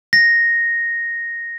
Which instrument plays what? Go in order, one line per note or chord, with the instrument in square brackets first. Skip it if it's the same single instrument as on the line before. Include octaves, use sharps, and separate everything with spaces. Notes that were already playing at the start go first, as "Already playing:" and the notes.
[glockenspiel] A#6